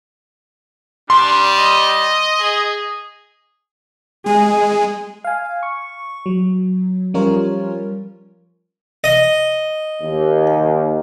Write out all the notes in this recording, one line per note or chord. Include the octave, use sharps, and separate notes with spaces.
G3 D4 C6
D#5
G#4
G#3 G#4
F5 G#5
C#6
F#3
F3 G3 C#4 F4 A#4 C#5
D#5
D#2